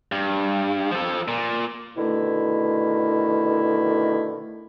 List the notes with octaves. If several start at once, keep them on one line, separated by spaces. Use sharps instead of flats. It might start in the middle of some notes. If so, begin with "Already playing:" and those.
G2
F3 A4
A#2
B2 D3 D#3 A3 E4